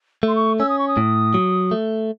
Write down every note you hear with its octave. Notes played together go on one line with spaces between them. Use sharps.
A3 C6
C#6
C#4 E6
D#6
C#6
D#6
A2
F#3
A3